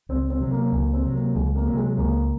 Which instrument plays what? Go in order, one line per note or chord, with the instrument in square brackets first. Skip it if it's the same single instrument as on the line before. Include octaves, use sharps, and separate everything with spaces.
[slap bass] C#2 [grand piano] C4
[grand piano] C4
[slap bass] C3 F#3
[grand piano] A#3
[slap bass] C#2 [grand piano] A#3
[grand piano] C4
[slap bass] C3 F#3
[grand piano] A#3
[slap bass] C#2 [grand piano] G#3
[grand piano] A#3
[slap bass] C3 F#3
[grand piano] G#3
[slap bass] C#2 [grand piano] A#3